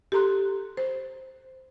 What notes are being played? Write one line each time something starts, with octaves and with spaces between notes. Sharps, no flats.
G4 A4 A#5 C6 F#6
C5